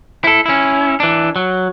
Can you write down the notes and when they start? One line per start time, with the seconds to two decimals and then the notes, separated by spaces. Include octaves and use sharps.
0.24 E4 A4
0.46 C#4 E4
1.00 E3 D4
1.36 F#3